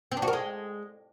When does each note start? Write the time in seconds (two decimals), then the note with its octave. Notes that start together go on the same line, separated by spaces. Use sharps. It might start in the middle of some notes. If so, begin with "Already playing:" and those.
0.12 C4
0.17 D4
0.22 F#4
0.28 A#4
0.33 G#3